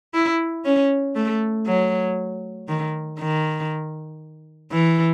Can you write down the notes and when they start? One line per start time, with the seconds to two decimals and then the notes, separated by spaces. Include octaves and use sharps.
0.14 E4
0.65 C#4
1.15 A3
1.67 F#3
2.68 D#3
3.19 D#3
4.72 E3